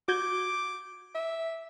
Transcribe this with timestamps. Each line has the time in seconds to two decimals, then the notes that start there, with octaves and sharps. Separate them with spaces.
0.08 F#4 D6 G6 G#6
1.15 E5